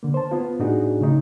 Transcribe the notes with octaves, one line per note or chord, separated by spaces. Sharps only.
D3 A#3
C5 A5
B3 F4
A2 D4 D#4 F#4 G#4
C#3 A3 D#4